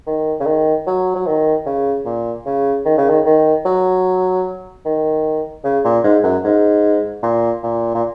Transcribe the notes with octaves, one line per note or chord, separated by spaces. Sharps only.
D#3
C#3
D#3
F#3
F#3
D#3
C#3
A#2
C#3
D#3
C#3
D#3
D#3
F#3
D#3
C#3
A#2
G#2
F#2
G#2
A#2
A#2
A#2